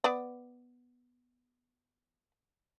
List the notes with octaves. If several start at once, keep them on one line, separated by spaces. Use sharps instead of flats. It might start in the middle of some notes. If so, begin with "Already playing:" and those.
B3 D5